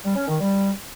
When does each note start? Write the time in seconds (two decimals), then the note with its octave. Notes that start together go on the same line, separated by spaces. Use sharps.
0.04 G3
0.16 C#4
0.28 D#3
0.40 G3